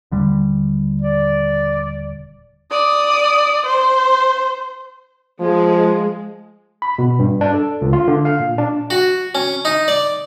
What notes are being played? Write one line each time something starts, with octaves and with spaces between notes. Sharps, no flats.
D#1 D3 G3
D5
D5 D#6
C5
F3 G#3
B5
B2
G2
D4
A4
C#2
F4
D3
F5
A#2
D4
F#4
C#4
D#4
D5